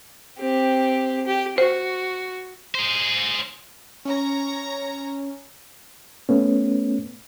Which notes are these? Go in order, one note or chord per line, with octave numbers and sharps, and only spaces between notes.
C4 G4
G4
F#4 C5
G#4 C5
C#4 C#5 A#5
A3 B3 C#4